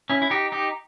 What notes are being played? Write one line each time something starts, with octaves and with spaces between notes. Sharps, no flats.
C#4 E4
E4
D#4 G4
D#4 G4